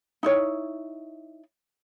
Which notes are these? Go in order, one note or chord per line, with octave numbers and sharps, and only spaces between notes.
D#4 E4 C#5